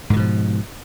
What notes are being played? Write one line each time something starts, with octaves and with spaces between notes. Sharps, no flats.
G#2 B2 D#3 F3